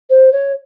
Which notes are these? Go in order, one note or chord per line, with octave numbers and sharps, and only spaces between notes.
C5
C#5